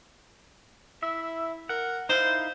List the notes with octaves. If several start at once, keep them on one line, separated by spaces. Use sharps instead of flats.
E4 E5
A#4 F#5
D#4 E4 C5 F5